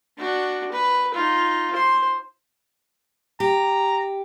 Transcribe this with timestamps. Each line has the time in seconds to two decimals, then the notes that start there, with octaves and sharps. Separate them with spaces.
0.18 D4 F#4
0.72 B4
1.14 D#4 F4
1.72 C5 C6
3.40 G4 A#5